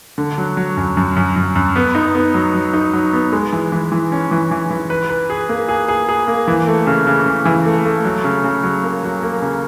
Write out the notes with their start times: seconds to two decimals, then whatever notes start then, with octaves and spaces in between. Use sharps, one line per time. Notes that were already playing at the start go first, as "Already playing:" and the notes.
0.18 D3
0.38 F#3
0.57 F#3
0.77 F#2
0.97 F#2
1.16 F#2
1.36 F#2
1.55 F#2
1.76 B3
1.95 D#4
2.15 B3
2.34 F#3
2.54 F#3
2.74 D#4
2.94 F#3
3.13 B3
3.33 G#3
3.53 E3
3.72 E3
3.92 E3
4.12 C#4
4.31 E3
4.51 E3
4.70 E3
4.90 B4
5.10 B4
5.30 G#4
5.49 A#3
5.69 G#4
5.88 G#4
6.09 G#4
6.28 A#3
6.47 E3
6.67 A3
6.87 C#3
7.07 C#3
7.26 C#3
7.45 E3
7.66 A3
7.85 A3
8.05 F#3
8.24 C#3
8.44 C#3
8.64 F#3
8.83 A#3
9.03 F#3
9.23 A#3
9.42 C#3